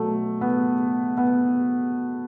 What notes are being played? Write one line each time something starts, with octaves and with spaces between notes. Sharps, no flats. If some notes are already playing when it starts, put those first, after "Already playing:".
Already playing: B2 F#3 A3
B3
B3